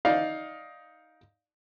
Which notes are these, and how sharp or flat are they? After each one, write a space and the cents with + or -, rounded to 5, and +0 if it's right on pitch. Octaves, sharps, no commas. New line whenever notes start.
D#4 +10 D5 +5 F5 +15